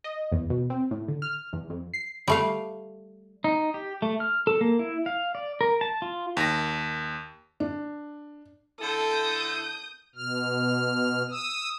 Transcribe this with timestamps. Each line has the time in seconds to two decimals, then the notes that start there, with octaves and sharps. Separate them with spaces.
0.04 D#5
0.32 E2
0.50 B2
0.70 C4
0.91 A2
1.08 D3
1.22 F6
1.53 E2
1.70 F2
1.94 C7
2.28 G3 A3 F5
3.44 D#4
3.74 G4
4.02 A3
4.20 F6
4.47 A4
4.61 A#3
4.79 E4
5.06 F5
5.35 D5
5.61 A#4
5.81 A5
6.02 F4
6.37 D#2 A#6
7.60 D4
8.80 D3 E4 A4 D#6 G6
10.15 B2 F6
11.30 D#6 E6